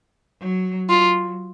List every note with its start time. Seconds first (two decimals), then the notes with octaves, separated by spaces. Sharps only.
0.40 F#3
0.89 F#3 F4